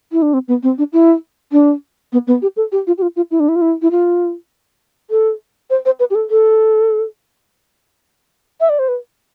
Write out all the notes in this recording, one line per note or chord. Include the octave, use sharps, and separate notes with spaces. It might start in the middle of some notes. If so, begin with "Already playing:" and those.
E4
D4
C4
B3
C4
D4
E4
D4
B3
B3
G4
A4
G4
F4
G4
F4
F4
E4
D4
E4
F4
E4
E4
F4
A4
C5
C5
B4
G4
A4
A4
E5
D5
C5
B4